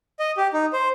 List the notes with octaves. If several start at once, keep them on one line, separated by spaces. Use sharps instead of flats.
D#5
G4
D#4
C5